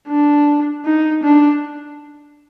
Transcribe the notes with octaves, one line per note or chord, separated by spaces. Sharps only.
D4
D#4
D4